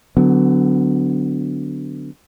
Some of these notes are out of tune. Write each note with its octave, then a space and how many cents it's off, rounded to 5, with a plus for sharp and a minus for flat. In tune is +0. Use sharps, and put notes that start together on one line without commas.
D3 +0 F#3 +0 B3 +30